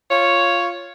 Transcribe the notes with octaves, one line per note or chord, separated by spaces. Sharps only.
F4 C#5